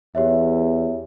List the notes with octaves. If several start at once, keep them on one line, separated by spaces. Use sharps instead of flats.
E2 G4 C#5 E5